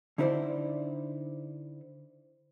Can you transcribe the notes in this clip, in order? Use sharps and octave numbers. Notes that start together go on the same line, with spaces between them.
D3 D#4 E4 A#4 C5 D5